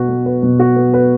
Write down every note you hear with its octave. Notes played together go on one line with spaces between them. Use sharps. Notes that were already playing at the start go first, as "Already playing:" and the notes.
Already playing: B2 F#4 B4
B3
B4
B2
F#4
B3
B4